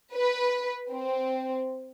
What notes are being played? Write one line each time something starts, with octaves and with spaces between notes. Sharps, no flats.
B4
C4